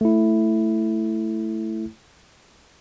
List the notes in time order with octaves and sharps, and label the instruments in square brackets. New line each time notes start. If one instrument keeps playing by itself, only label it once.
[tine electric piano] A3 E4